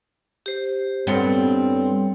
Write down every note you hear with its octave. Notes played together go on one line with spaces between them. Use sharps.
G4 C5
G2 B3 C4 A4 C#5 G5